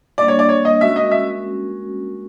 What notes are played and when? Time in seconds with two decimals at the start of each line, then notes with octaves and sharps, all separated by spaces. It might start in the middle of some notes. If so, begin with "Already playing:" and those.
0.18 G3 A#3 D4 D5
0.28 C#5
0.39 D5
0.49 C#5
0.65 D#5
0.81 G#3 C#4 F#4 A#4 E5
0.96 D#5
1.11 E5